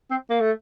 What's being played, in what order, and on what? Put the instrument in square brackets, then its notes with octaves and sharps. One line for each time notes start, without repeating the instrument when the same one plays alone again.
[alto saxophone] C4
A#3
A3